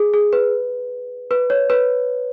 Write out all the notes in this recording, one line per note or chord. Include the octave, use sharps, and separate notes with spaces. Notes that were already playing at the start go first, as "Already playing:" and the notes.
Already playing: G#4
G#4
B4
B4
C#5
B4